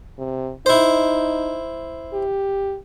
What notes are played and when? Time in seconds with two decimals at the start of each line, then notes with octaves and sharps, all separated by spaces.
0.18 C3
0.66 D#4 E4 C5
2.13 G4